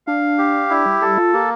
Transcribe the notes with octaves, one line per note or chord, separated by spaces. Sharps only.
D4 F5
G4
D4 E4
G3
G3 A4
F4
A#3 G4